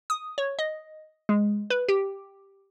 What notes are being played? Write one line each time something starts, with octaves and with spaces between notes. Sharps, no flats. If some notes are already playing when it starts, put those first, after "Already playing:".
D#6
C#5
D#5
G#3
B4
G4